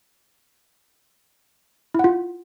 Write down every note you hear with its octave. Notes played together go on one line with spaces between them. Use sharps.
E4 F4 F#5